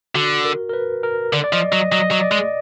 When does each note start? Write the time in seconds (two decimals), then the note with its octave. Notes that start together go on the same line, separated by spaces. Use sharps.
0.15 D3 F#4
0.45 A#4
0.69 A#4
0.73 B4
1.03 A#4
1.33 D3 D5
1.44 D5
1.52 F3 D#5
1.72 F#3 D#5
1.92 F#3 D#5
2.11 F#3
2.21 D5
2.32 G#3